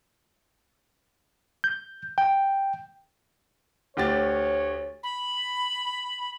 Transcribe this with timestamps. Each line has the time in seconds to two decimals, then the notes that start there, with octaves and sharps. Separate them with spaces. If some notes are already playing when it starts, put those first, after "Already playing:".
1.64 G6
2.18 G5
3.97 D2 G4 C#5 A6
5.03 B5